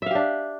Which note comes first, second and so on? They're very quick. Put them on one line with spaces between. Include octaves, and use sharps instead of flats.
E5 F5 G4 D4